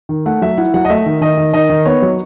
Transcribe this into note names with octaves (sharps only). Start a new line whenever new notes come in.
D#3
A3 F#5
F#3 E5
E4 F#5
F#3 F#5
D#5
A3 E5
D#3
D#3 D#5
D#3
D#3 D#5
D#3
B3 C#5
F#3